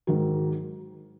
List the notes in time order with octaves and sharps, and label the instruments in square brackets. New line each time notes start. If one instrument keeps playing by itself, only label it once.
[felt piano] G#2 D#3 F#3